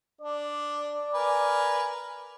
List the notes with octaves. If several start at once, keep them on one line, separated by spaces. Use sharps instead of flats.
D4 D5
A#4 B4 G#5